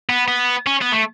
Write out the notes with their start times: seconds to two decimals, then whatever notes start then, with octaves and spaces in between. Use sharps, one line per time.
0.09 B3
0.28 B3
0.67 C#4
0.81 B3
0.92 A3